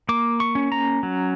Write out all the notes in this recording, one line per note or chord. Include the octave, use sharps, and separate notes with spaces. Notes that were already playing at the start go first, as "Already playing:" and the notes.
A#3 D6
C#6
C#4
A#5
F#3